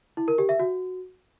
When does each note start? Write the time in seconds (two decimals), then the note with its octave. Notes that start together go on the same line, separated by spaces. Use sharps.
0.17 E4
0.28 A#4
0.38 G4
0.49 E5
0.60 F#4